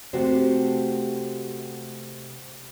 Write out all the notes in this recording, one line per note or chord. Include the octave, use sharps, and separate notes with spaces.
C3 A3 F#4 G4 C5